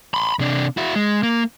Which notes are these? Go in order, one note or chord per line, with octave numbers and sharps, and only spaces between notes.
B5 C6
C3 D4
E4 F#4
G#3
A#3